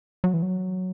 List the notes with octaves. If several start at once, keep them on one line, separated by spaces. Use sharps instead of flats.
F#3
E3
F#3